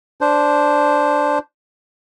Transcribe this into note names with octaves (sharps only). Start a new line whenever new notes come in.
D4 C5